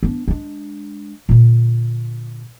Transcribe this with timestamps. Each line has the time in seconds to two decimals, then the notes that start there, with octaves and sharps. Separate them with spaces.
0.03 B3 D4
0.28 G#3 D4
1.29 A#2 D3